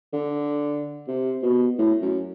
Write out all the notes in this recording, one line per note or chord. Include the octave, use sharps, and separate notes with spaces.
D3
C3
B2
A2
F#2